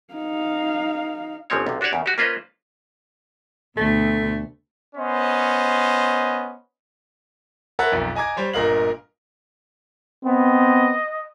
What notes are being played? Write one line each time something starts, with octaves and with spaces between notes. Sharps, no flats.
D#4 F5
G1 C#3 F3 C4 C#5
B1 C3
D4 F#4 G4 C#5 D5
E2 C#3
F#4 G4
A#3 C#4 F4 B4 C5 D#5
D2 B2 A3
B3 C#4 C5 D#5
A#4 B4 C#5 E5 F#5 A5
B1 F2
D#5 G#5 A#5 D6 G#6
G3 C5 C#5
G1 A#2 A#4 D#5 F5 F#7
B3 C4 D#5